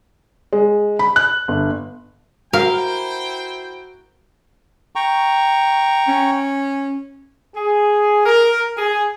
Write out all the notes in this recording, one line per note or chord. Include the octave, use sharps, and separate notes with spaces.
G#3
B5
F#6
G1
E4 F#4 A#4 C5 F5 G5
G5 A#5 C#6
C#4
G#4
A#4
G#4